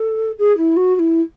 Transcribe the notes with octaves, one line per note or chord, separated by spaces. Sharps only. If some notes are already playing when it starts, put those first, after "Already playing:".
Already playing: A4
G#4
E4
F#4
F#4
E4